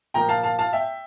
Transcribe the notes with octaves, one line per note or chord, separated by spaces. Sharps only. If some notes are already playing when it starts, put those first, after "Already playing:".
A#2 F3 A#3 G5 A#5
F5 A5
F5 A5
F5 A5
E5 G5